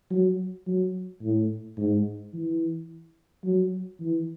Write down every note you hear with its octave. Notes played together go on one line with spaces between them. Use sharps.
F#3
F#3
A2
G#2
E3
F#3
E3